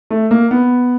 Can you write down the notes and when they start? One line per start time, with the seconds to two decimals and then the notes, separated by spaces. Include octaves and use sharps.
0.11 A3
0.31 A#3
0.51 B3